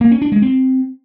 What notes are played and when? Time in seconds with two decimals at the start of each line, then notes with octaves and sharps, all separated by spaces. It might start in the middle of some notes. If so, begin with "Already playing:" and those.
0.01 A#3
0.11 C#4
0.22 D4
0.32 G#3
0.42 C4